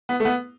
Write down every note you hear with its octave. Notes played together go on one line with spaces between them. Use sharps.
B3
A3
B3